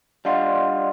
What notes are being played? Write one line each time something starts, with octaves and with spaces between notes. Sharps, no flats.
G3 D4 F4 D#5 F#5 C6